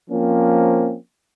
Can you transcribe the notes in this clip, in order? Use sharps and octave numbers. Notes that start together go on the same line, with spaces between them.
F3 A#3 C4 C#4